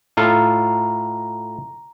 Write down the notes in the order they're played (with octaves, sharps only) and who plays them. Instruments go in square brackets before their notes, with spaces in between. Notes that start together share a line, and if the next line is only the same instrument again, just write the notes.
[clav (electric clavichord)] A2 F4 A4 [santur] A#5